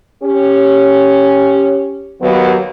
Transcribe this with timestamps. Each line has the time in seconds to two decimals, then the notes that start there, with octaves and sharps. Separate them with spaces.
0.23 C#4 G4
2.21 D#2 F#3 B3